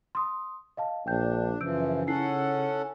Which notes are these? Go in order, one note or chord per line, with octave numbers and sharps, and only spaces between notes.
C6 D#6
D#5 F5 A5
A#1 D4 G5 G6
F#2 C#3 E3 F3 E6 G6 D7
C#4 D#4 E4 A4 F#5 C7